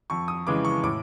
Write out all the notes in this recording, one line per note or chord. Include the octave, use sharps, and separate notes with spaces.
F2 C#6
D#6
C#3 E3 G#3 D6
C#6
A2 D6